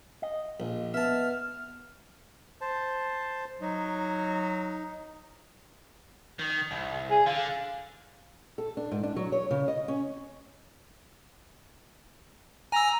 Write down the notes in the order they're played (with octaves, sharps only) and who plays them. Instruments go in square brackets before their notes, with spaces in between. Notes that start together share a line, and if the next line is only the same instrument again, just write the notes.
[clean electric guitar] D#5
[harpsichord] A#1
[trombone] B3 [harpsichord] E5 A5 [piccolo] F6
[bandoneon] C5 A5
[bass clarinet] F#3 [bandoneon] D#4
[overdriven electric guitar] D#3
C2
[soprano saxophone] G#4
[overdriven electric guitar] D3 [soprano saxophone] F5
[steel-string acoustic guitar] A4
D4
G#2
D4
F#3
C#5
C#3
D#5
C#4
[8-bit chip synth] G#5 E6 [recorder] A#5